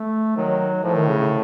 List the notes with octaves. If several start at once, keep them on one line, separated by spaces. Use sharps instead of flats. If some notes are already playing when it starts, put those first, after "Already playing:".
Already playing: A3
D#3 F#3
A2 F3
D#3
C#3
C#3